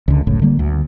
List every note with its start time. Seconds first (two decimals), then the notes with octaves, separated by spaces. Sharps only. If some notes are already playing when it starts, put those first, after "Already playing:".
0.08 C#2 D3
0.27 F#1 C#2 A2
0.42 D3 G3 A#3
0.59 D2